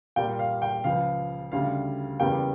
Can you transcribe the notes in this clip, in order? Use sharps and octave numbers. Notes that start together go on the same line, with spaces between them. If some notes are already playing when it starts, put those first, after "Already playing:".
A#2 G3 A#3 G5
F5
G5
C#2 C#3 F3 F5
D2 C#3 G3 F5
E2 C#3 G3 A#3 G5